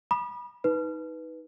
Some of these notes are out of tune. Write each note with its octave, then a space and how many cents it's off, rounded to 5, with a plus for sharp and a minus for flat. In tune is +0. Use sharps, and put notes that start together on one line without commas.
B5 -25 D#6 -45
D#4 +25 B4 +0